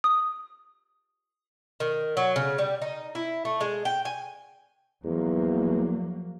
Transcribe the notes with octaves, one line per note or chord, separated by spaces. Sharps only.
D#6
D#3
F#3
C#3
G3
D#4
E4
A3
G#3
G5
G#5
E2 F3 F#3 A#3